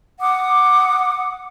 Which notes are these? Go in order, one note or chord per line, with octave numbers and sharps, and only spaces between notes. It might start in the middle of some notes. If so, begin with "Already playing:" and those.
F#5 D6 D#6